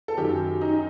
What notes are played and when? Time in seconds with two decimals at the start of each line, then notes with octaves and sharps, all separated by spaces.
0.08 A4
0.17 F#2 D#3 G4
0.61 D#4